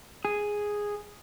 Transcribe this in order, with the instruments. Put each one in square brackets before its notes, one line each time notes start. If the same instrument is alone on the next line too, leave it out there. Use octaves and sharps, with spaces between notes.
[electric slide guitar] G#4